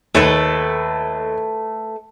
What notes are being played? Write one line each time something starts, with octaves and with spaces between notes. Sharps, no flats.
D#2 A3 A4 B4